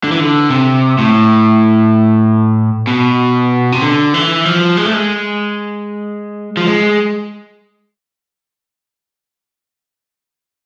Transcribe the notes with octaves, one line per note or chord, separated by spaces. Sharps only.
D3
E3
D3
C3
A2
B2
C3
D3
E3
F3
G#3
A3
G#3
F3
G#3